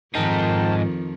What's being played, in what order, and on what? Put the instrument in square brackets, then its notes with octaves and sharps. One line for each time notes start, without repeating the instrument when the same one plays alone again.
[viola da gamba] F2 D#3 F3 [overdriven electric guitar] G#2 D#4 [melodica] A#4 G5 A5